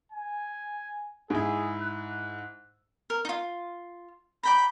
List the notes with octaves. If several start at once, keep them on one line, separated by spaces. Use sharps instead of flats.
G#5
G#2 E4 G#4
F#6
A#4
D#4 F4
D5 G5 A#5 B5